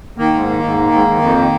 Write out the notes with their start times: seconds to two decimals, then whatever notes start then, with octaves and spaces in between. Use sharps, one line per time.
0.18 D#3 A#3
0.34 G#2
0.48 D#3
0.63 G#2
0.78 D#3
0.92 G#2
1.07 D#3
1.21 F2
1.37 D#3